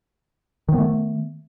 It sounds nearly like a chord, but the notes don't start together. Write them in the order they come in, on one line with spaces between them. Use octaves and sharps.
D#3 B3 A3